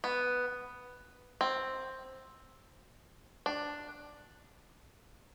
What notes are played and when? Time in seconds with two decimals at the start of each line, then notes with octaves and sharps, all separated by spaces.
0.04 B3
1.41 C4
3.46 D4